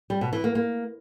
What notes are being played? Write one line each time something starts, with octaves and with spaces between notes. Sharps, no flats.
G3
B2
E3
A#3
A#3